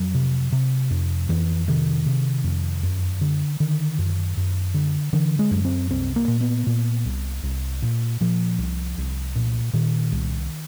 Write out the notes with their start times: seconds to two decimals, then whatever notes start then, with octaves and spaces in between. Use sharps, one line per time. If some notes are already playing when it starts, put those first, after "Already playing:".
Already playing: F2 F#3
0.14 C3
0.52 C3
0.91 F2
1.29 F2 E3
1.68 C3 D#3
2.06 C3
2.44 F2
2.83 F#2
3.21 D3
3.60 D3 D#3
3.98 F#2
4.37 F#2
4.74 D3
5.13 D3 E3
5.39 G#3
5.51 F#2
5.65 C4
5.89 C2 C4
6.16 A#3
6.28 A#2
6.41 B3
6.67 A#2
7.05 C2
7.43 C2
7.82 A#2
8.21 A#2 F3
8.58 C2
8.98 C2
9.35 A#2
9.73 A#2 D#3
10.12 C2